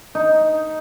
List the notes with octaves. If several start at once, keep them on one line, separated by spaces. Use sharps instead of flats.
D#4